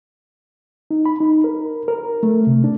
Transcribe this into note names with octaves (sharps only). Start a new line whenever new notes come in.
D#4
B5
D#4
A#4
A#4
A3
C3
D4